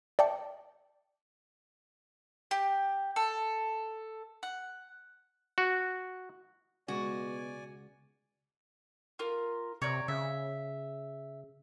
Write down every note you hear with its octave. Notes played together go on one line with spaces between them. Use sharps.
D5 E5 G5 A5 D6 C#7
G4
A4
F#5
F#4
C#2 B2 G#3 F#4 D5 G#5
F4 A#4
C3 C#5 D5 A#5
C#3 E5